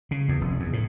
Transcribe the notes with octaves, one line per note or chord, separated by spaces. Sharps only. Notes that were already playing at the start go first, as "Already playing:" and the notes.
C#3
E2
F1
E2
A2